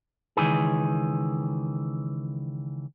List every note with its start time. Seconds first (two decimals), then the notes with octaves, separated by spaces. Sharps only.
0.37 C#2 D#3 E3 G#4